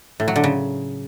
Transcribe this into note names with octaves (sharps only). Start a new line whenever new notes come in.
A2
F#3
D3
C#3